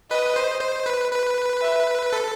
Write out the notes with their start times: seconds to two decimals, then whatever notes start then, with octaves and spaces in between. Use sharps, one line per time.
0.11 B4 D#5
0.36 C5
0.61 C5
0.86 B4
1.11 B4
1.62 E5
2.13 A4